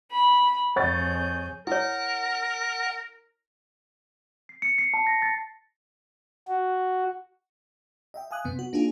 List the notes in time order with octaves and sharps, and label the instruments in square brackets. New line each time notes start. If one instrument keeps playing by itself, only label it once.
[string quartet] B5
[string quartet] F2 G#4 G6 [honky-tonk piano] C#5 A6
[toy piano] E4 C#5 [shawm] A#4 [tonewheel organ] F#5
[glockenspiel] C7
C#7
C7
A5
A#6
A6
[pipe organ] F#4
[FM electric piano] D#5 E5 G5
F5 G#5 D#6 F#6
F#2 C3 B3
F#4
A#3 D4 D#4 F4 G#4